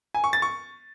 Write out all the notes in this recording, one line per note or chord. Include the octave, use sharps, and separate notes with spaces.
G#5
C#6
A6
C#6